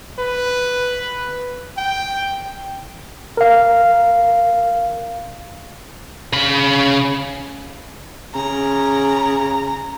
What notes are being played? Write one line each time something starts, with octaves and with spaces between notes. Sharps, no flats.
B4
G5
A#4 F5
C#3 B5
C#3 A#5